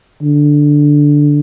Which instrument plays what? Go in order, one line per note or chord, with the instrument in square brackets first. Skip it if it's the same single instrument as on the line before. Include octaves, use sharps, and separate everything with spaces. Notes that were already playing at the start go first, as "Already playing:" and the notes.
[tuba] D3